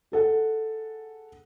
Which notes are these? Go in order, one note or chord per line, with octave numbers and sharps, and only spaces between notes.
G#4 A4 F#5